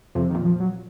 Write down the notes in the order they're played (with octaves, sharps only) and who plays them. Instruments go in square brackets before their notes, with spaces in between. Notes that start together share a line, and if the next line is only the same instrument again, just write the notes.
[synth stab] F2 [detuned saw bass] C3
[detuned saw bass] D#3
[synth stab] A#2
[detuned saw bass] F3
F#3